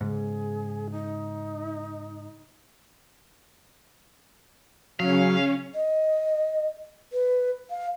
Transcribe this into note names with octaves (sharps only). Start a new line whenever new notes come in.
G#2 C#3 G#4
D#4
C#3 F#3 C#4 F5
D#5
B4
F5